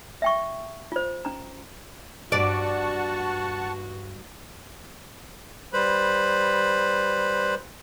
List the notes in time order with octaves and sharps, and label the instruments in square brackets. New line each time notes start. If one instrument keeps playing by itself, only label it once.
[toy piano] E5 G5 C#6
F4 C5
C#4 A#5
[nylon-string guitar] G2 [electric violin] F#4 [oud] D5 [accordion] F#5 A5 C#6
[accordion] G3 B4 C5 B5